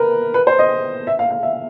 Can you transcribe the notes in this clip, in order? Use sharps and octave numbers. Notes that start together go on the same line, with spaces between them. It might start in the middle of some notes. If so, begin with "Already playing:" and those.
Already playing: A#4 B4
B4
C5
D#5
E5
F5
F5
E5